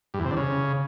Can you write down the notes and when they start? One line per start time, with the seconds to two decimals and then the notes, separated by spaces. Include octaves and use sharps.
0.14 G2
0.20 E2
0.25 C3
0.31 D3
0.37 C#3